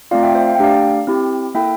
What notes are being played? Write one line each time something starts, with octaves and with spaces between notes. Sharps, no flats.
A3 C4 F4 D5 F5
E5 G5
C5 E5
F5
G5
A3 D4 G4 D5 F5
C4 E4 G4
A#3 E4 A4 E5 G5